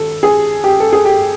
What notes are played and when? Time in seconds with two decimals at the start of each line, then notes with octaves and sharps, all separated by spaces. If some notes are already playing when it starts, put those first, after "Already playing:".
Already playing: G#1 A4
0.23 G#4
0.64 G4
0.80 A4
0.93 G#4
1.05 G4